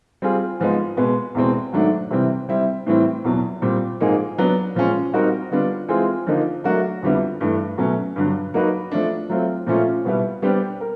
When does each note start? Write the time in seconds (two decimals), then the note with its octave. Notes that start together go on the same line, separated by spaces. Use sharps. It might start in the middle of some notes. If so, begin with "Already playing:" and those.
0.22 G3 C4 F4 G#4
0.60 G#2 F3 G#3 B3 D#4
0.97 B2 G#3 B3
1.35 E2 B2 G#3 C4
1.73 G#2 D#3 F#3 A3 D4
2.11 C3 E3 G3 C4
2.49 G3 C4 E4
2.86 A2 E3 G3 C4 E4
3.24 E2 B2 F#3
3.62 A#2 G3 C4
4.00 G#2 F3 A#3 D#4 G#4
4.38 F#3 B3 D4
4.75 A#2 F3 G#3 C#4
5.13 G3 C4 D#4 F#4 A#4
5.51 D3 G3 B3 D4 F4
5.88 E3 G#3 C4 F4 G#4
6.26 D3 F3 A#3 D#4
6.64 F#3 A3 D4 F#4 A#4
7.03 F2 D3 G3 B3 E4
7.41 G2 E3 A3
7.78 B2 F#3 A3 C#4
8.16 G2 D3 F#3
8.54 F#3 A#3 D#4 F#4 B4
8.91 F3 A3 D4
9.29 F#3 A3 C4 F4
9.67 A#2 F3 A3 C#4 F4
10.05 B2 G3 B3 E4
10.42 G3 B3 D4 G4 C5
10.81 A#4